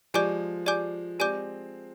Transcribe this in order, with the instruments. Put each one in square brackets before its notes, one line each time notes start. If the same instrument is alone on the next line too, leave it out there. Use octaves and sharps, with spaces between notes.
[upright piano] F3 G#3 [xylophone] G4 D5 G#5 D6 G6
[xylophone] G4 D5 G#5 D6 G6
[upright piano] G#3 C4 [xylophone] G4 D5 G#5 D6 G6